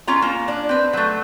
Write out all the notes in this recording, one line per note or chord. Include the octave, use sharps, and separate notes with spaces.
C#4 F4 A#5
A#3
D4
C4 B4
F#3 A3